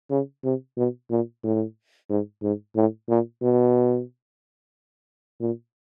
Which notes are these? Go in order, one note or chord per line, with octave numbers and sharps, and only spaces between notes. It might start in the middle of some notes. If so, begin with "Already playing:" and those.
C#3
C3
B2
A#2
A2
G#2
G#2
A2
A#2
B2
A#2